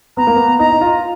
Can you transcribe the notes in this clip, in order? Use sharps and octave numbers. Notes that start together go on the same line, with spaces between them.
B3 A#5
A#3
B3
D#4 A#5
D#4
F4